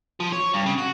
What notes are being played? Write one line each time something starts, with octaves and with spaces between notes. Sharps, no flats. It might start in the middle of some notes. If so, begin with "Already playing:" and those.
F3
C#5
G2
C#3
F#4